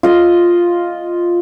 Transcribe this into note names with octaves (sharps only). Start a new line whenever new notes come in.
F4 D#5